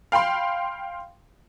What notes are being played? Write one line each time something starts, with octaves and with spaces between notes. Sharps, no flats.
F5 G5 B5 C6